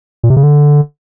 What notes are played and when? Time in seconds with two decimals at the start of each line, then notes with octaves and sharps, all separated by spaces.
0.23 A#2
0.30 C3
0.37 C#3
0.43 D3